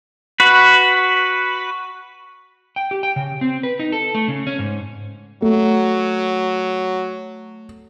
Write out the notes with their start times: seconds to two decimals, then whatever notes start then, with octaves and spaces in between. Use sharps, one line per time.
0.40 F#4 B4
2.76 G5
2.91 G4
3.03 G5
3.16 C#3
3.41 C4
3.63 B4
3.79 D#4
3.92 A4
4.15 A3
4.28 C#3
4.47 C#4
4.59 G#2
5.42 F#3 A3